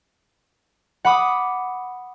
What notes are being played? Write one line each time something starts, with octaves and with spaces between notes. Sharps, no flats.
F#5 B5 D6 D#6